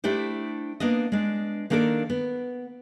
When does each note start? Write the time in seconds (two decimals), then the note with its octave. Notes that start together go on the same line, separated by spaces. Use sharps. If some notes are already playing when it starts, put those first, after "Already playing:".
0.04 A3 D4 E4 G4 C5
0.80 A#3 B3 D4 D#5
1.12 G#3 D4
1.70 D#3 A#3 D4 A4 A#4 D5
2.10 B3